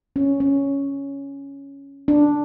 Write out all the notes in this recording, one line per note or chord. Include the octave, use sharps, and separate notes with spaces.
C#4
C#4
D4